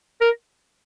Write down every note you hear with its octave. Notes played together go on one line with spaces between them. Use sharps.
A#4